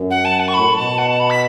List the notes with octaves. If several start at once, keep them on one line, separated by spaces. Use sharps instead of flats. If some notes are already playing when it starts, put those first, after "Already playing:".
Already playing: F#2
F#5
A5
F#5
C#6
A2 B5
A2
B2 A5
F#5
A5
B5
B6